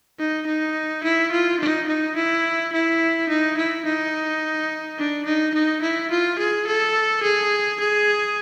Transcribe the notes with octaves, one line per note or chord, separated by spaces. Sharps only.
D#4
D#4
E4
F4
D#4
D#4
E4
E4
D#4
E4
D#4
D4
D#4
D#4
E4
F4
G#4
A4
G#4
G#4